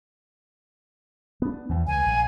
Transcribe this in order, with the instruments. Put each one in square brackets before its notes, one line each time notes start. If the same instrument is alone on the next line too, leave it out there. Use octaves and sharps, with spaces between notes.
[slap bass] B3 D4
E2 E3 F3
[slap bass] C#2 [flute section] G#5
[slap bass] A#1